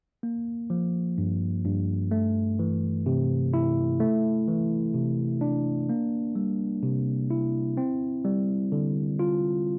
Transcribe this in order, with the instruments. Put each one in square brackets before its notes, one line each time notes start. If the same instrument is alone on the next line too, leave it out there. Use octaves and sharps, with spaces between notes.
[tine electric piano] A#3
F3
G2
G2
A3
E3
C3
E4
A3
E3
C3
D4
A#3
G3
C3
E4
C4
G3
D3
F4